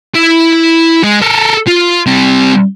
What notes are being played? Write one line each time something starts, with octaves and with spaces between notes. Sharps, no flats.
E4
G#3
A4 A#4
F4
G3 C4